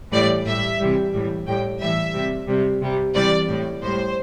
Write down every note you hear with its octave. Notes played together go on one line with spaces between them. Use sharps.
A2 E3 G3 D5
A2 G3 E5
C3 E3 G3
A2 E3 G3
A2 G3 G5
A2 E3 G3 E5
C3 G3
C3 G3
C3 G3
C3 E3 G3 D5
A2 G3
A2 G3 C5